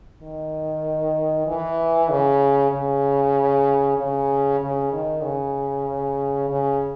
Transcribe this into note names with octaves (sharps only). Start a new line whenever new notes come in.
D#3
E3
C#3
C#3
C#3
C#3
D#3
C#3
C#3